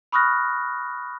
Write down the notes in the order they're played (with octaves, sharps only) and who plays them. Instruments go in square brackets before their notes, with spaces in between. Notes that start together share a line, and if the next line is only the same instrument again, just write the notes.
[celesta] B5 C#6 D#6 F6 F#6 A#6